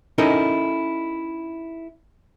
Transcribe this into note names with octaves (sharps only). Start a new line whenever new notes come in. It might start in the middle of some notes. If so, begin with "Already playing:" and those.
C#4 D#4 E4 A4 A#4 D#5